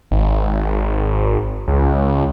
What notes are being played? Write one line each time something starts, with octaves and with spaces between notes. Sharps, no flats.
G#1
C#2